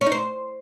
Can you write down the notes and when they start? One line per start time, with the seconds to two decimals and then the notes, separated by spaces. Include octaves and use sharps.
0.01 C#4
0.06 D#4
0.12 C5